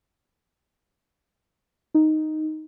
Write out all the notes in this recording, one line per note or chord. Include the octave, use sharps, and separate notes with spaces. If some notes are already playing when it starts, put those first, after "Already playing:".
D#4